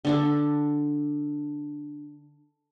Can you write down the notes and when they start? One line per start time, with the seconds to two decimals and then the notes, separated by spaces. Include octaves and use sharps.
0.05 D3 D4 A4